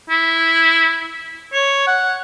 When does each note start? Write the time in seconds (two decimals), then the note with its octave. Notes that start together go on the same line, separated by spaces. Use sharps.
0.10 E4
1.53 C#5
1.87 F#5